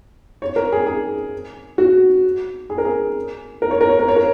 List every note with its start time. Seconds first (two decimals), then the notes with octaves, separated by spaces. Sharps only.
0.42 C#5
0.56 A#4
0.72 G#4
0.87 G#4
1.78 F#4
2.70 G#4
2.78 A#4
2.85 G#4
3.62 A#4
3.71 C#5
3.81 A#4
3.89 C#5
3.99 A#4
4.08 C#5
4.16 A#4